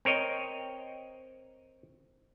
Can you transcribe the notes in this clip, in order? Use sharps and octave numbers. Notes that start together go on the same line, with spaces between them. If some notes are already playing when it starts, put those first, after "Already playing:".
C4 A#4 C#5 D#5